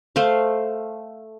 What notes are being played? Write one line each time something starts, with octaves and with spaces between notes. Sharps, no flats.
A3 C5 F5